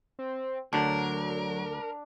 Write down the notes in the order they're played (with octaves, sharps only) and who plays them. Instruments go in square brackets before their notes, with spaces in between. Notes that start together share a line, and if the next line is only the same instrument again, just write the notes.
[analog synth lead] C4
[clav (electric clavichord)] D2 D3 [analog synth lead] F#3 [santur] D4 [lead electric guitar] A#4